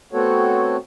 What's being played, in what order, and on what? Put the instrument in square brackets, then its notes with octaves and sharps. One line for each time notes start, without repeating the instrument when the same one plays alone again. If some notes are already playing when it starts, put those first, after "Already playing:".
[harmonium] A3 B3 C4 F#4 A4 C#5